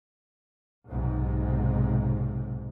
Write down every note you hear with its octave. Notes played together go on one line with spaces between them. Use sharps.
B1 G#2 C3